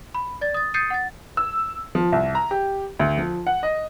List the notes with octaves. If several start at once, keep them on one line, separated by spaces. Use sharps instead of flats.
B5
D5 A6
D#6 A6
D#6 G6 A6 C7 C#7 D#7
F#5 A6
E6
F3
C2
A#5
G4
D2
F3
F#5
D#5